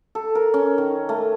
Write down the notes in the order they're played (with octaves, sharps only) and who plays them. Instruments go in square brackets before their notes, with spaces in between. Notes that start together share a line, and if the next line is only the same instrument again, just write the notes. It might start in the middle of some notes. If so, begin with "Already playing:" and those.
[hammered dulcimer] A4
A#4
C#4
D#3
A3